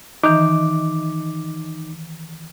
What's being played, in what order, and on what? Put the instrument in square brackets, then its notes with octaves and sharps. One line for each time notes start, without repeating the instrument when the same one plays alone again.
[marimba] D#3 E3 [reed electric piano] D#4 D6